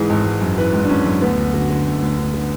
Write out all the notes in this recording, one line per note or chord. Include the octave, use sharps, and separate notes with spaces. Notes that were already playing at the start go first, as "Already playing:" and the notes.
Already playing: G#2 E3 G#4
G#1
G#1
F#2
E3 B4
G#1
D4
G#1 C#4
F#2
D2 B3
D2
D3 F#4
D3
D2
D2
D3
D3